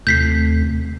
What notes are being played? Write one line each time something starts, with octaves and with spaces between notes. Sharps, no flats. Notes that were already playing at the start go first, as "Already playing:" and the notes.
D#2 C3 A3 G6 B6 C7